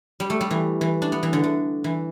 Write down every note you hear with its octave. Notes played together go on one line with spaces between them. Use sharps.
G3
A3
G3
E3
E3
D4
B3
E3
D3
D3
E3